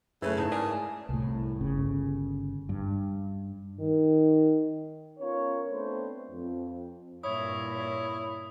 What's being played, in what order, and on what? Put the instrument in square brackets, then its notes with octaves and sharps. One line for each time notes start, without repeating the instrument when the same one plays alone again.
[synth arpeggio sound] F#2 [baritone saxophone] C#3 [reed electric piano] A3 E4 [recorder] B4
[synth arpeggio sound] G#2 D#4 G#6 [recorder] A5
[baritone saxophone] G#4 [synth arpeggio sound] A#4 D5
[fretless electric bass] C2 A2
G1 C#3
G2
[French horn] D#3
[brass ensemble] B3 C#4 F4 A#4 C#5
A3 B3 C4 D4 B4 C5
F2
[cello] G2 A#2 [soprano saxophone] E4 [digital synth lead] C#5 [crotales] D#6